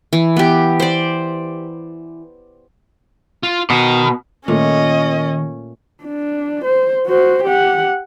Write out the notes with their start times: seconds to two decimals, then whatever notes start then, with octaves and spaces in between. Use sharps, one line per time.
0.13 E3
0.36 B3 G4
0.80 C5 D5
3.43 F4
3.70 B2 A#4 D#5
4.48 A#2 D#3 A3 C#4 D#5
6.03 D4
6.64 C5
7.06 F#4 C5
7.44 G4 F#5